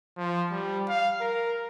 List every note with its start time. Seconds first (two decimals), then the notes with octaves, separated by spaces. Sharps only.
0.17 F3
0.51 G3
0.89 F5
1.21 A#4